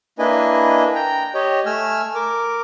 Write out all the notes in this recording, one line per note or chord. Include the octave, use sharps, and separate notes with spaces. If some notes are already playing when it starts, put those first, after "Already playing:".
A#3 D4 E4 B4 D#5 G#5
G5 A#5
G4 C#5 D#5
A3 G#5 E6 F6
A#4 D6